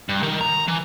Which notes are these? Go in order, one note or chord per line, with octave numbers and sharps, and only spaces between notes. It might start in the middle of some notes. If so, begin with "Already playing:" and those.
G2
D#3
A#5
E3